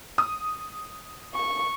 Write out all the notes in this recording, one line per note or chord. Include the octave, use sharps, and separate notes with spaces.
D#6
C#6